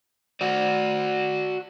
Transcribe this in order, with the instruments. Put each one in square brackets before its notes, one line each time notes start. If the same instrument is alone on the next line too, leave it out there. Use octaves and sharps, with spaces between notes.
[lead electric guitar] F#4 D5